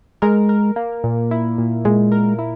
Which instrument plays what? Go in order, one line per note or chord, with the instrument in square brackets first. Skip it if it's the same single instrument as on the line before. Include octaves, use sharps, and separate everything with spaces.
[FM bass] G#3 [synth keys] A#4
[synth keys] A#4
A#3
A#2
E4
A#2
[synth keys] A#2 [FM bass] G#3
[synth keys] A#4
E4